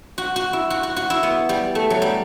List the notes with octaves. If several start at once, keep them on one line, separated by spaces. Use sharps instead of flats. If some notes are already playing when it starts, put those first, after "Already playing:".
F#4
F#4
E4
F#4
F#4
F#4
E4
B3
G3
A3
F#3
G3